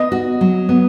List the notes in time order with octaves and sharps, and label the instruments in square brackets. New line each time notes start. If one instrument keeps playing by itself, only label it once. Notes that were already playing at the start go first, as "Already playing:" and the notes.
Already playing: [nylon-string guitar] B3 [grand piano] D#5
[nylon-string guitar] F#4
F#3
B3